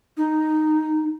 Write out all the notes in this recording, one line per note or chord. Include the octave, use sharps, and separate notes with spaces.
D#4